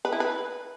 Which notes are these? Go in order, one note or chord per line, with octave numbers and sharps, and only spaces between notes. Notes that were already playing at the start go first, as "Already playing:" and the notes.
B4
E4
B4